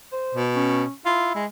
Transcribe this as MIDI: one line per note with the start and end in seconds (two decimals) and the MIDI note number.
0.12 0.39 72
0.35 0.84 47
0.55 0.91 61
1.05 1.41 64
1.05 1.33 65
1.35 1.46 56